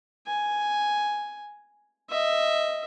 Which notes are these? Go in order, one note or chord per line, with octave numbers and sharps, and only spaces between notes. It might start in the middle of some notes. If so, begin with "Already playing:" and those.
G#5
D#5 E5